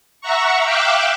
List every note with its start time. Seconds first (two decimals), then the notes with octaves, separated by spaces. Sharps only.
0.21 E5 F#5 A#5 C#6
0.62 E5 F5 G5 D6 E6 F#6